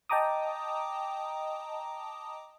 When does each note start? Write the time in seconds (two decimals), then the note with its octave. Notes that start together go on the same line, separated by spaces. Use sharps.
0.10 D#5 G5 A5 A#5 D6 D#6